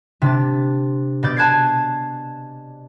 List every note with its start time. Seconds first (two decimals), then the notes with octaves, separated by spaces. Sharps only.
0.22 C3 D4 A6
1.23 B2 D5 G6 A6
1.37 G#5 A5 F#6 G#6 A6 C7